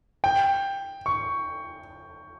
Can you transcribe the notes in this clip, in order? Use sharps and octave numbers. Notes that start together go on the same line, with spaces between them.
G5
C#6